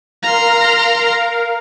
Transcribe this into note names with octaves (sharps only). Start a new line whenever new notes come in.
A#4 F5 A#5 C6